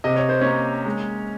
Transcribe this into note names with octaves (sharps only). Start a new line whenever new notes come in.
C3 D#5
C#5
C5
A#3 C#4 C#5
G#3